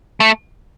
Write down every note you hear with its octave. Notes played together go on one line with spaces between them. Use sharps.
A3